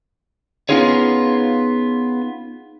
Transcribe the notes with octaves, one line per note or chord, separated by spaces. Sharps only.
B3 C#4 D#4 F4 G#4 C#5